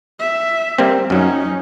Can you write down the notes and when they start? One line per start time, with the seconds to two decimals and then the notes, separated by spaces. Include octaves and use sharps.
0.20 E5
0.78 G3 A#3 C4
1.10 F#2 F#3 C#4 D#4